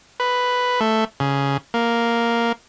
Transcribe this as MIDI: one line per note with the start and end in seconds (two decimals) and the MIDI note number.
0.20 0.80 71
0.80 1.04 57
1.20 1.57 49
1.74 2.52 58